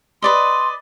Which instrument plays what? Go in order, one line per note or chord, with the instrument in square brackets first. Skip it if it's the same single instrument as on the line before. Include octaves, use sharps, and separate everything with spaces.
[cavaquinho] B4 D5 D#5 [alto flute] C6